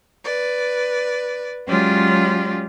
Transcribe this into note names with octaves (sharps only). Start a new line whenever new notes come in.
B4 D5
F#3 G#3 C#4 F4 G4 D5